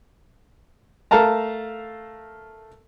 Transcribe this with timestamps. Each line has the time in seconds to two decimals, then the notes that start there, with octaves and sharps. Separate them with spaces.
1.11 A3 A#4 F5 A5 A#5